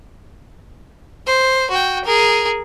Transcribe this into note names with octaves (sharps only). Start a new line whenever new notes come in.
C5
F#4 G5
G#4 A#4